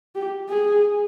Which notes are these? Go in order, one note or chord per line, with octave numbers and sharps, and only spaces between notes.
G4
G#4